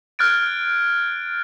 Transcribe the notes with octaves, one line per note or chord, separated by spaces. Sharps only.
F6 F#6 G#6 A6 D7